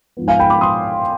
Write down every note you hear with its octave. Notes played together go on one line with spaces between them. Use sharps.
G#2 F3 B3
F5 G#5
G5 B5
B5 D6
C6 D#6